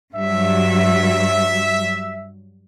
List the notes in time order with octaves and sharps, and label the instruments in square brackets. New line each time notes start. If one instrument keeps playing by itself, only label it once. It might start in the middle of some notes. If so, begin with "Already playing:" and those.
[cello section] G2 F#3 [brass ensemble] E5